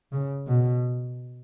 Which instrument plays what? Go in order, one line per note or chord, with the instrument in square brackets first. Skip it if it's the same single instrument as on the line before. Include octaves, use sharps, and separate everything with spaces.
[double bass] C#3
B2